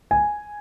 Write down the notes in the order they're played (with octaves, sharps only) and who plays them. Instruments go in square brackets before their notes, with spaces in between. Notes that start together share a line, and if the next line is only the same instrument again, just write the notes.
[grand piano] G#5